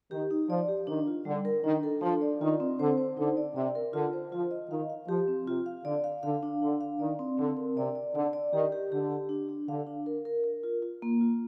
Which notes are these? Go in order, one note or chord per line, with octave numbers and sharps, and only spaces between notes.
D#3 G4
D#4
F3 D5
G4
D#3 D4
F4
D3 G3
A#4
D#3 D4
A4
F3 D4
D5
D#3 F4
C4
D3 C5
C5
D3 D#4
D5
C3 D5
A#4
D3 F4
C5
F3 F4
D#5
D#3 F5
F5
F3 G4
C4
C3 F4
F5
D3 D5
F5
D3 F5
D4
D3 D4
F5
D#3 D5
C4
D3 C4
A#4
C3 D5
D5
D3 D5
D5
D#3 G4
G4
D3 G4
G4
D4
D4
D3 F5
D4
A#4
A#4
A#4
F4
F4
A#3
F4